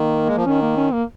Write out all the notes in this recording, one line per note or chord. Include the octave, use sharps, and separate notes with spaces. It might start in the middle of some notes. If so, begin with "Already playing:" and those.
Already playing: D#3 A#3
G#3
F3
D#3 C#4
A#3
C#4
A#3